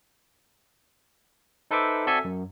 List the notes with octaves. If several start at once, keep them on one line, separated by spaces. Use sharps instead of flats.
D#4 A4 B4 C5 E5 D6
C4 F#4 A4 D5 E5 G#5
F#2